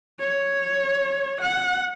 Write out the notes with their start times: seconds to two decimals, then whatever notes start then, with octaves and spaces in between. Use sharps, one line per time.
0.20 C#5
1.41 F#5